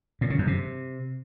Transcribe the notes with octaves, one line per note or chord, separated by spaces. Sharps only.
A2
C#3
F#2
C3